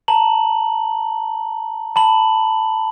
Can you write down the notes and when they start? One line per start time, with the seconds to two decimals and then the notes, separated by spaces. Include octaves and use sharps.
0.08 A5 A#5 F#7
1.96 A5 B5 F#7